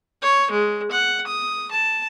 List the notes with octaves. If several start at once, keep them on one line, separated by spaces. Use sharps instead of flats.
C#5
G#3
F#5
D#6
A5